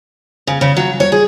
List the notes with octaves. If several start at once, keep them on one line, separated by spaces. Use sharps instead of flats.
C#3
C#3
F#3
C#5
G#4